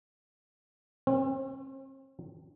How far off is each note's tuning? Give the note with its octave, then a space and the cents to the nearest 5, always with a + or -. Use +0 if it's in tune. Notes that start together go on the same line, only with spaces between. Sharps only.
C4 +45